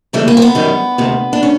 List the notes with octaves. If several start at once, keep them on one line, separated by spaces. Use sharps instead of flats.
D#2 C#3 E3 G3 A3
A#3
C4
B3
F#2 D#3 G3
D2 C3 D#3
D4
D#3 C#4